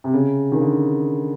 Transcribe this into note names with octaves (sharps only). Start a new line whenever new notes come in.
C3
C#3
D#3
D3